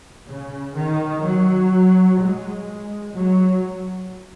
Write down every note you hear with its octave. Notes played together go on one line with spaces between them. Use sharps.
C#3
D#3
F#3
G#3
F#3